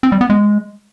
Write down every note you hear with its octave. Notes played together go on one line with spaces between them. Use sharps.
C4
G3
B3
G#3